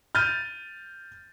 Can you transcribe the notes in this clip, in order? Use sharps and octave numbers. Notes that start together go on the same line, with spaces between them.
F6 G6 A6 D#7